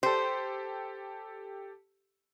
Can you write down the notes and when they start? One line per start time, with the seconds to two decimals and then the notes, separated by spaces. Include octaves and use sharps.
0.03 G4 A4 C5